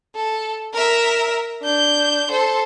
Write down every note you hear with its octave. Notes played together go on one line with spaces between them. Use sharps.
A4
A#4 E5
D4 G6
A4 C5